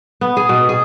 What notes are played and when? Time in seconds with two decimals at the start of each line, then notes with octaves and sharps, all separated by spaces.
0.21 B3
0.37 G#4
0.49 B2
0.69 G#4